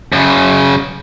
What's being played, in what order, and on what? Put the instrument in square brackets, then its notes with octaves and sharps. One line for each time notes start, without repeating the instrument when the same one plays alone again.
[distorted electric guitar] F#2 C#3